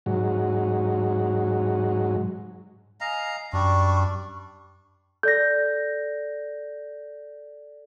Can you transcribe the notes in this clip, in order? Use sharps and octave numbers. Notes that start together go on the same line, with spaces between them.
G#2 F#3
D#5 F5 G#5 A#5
F#2 G3 D4 C#6
A4 D5 G6 A#6